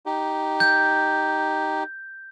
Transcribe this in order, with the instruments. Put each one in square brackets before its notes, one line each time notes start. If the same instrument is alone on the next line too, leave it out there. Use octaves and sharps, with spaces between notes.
[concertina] D#4 G4
[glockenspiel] G6